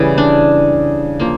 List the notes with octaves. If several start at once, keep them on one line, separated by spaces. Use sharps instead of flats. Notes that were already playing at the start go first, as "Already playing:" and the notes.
Already playing: C#3 E3 G3
D4
F3 A#3